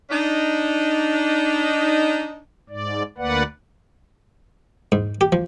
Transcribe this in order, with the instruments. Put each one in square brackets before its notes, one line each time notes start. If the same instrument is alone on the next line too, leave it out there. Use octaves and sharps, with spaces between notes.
[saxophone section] D4 D#4
[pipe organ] G#2 D5
D2 A#3 B4 D5 F#5
[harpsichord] G#2
G4
F3